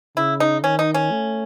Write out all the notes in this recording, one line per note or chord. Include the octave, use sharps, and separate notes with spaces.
C#3 E4
D#4
D#3 C#4
D#4
C#4
A3